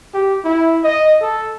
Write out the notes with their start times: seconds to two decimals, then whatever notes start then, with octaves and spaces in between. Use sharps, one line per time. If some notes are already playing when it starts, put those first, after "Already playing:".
0.14 G4
0.44 E4
0.84 D#5
1.21 A4